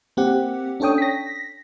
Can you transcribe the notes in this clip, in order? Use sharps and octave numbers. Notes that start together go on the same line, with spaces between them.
A#3 C4 G4 F#5
C#4 D4 A4 C#5 G5 D#6
A#6 B6